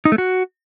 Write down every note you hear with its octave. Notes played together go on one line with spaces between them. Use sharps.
D#4
A3
F#4